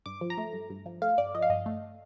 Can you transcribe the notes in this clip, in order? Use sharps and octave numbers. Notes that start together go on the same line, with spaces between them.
G2 D6
F3
A#5
A3
G2
G2
F3
A3 F5
G2 D5
F3 D#5
F5
G2 D#5
A3